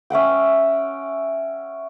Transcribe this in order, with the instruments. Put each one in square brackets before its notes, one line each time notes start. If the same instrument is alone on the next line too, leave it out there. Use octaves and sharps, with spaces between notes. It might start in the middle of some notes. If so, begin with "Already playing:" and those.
[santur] C#4 E5 F#5 G5